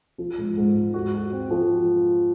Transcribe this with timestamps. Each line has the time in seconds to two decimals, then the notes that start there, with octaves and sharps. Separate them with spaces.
0.18 F3
0.38 G#2
0.57 G#2
0.75 G#2
0.94 F#4
1.14 F#4
1.32 C4
1.51 F3